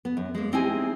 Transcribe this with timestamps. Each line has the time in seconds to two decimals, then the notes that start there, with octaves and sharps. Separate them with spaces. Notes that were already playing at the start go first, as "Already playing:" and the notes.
0.05 B3
0.17 F#2
0.35 G#3 A#3
0.53 C4 D#4 E4 G4 G#4 G#5